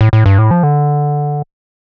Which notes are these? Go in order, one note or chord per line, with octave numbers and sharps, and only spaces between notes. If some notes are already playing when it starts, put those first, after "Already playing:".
A2
A2
G2
A2
F3
D3